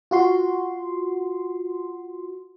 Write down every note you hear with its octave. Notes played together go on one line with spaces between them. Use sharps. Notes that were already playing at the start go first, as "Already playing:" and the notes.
F4 F#4 C6